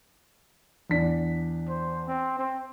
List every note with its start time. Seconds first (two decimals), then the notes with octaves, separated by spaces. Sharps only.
0.90 E2 D4 B6
1.69 C5
2.07 C4
2.39 C4